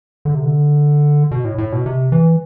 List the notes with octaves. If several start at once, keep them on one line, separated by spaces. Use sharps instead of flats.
D3
C3
D3
B2
A2
A2
B2
C3
E3